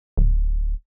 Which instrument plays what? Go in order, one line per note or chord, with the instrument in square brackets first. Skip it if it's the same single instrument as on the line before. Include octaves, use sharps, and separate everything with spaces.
[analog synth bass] D1